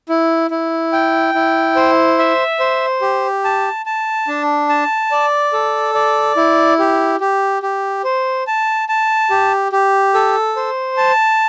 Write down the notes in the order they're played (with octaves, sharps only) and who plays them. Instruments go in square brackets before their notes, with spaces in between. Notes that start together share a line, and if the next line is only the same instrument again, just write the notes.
[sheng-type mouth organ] E4
E4
G5
E4
C5
E5
C5
G4
A5
A5
D4
A5
D5
A4
D5
E4
G4
G4
G4
C5
A5
A5
G4
G4
A4
C5
A5